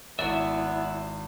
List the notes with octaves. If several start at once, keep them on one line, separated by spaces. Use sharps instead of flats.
G#1 B3 E4 C#5 D5 E5 A6